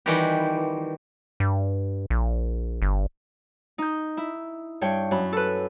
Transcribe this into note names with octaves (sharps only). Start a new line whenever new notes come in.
D#3 E3 G3 C4 F#4 G4
G2
A#1
G1
D#4 G6
E4
G2 C#5 G5
F#2 B5
A4 B4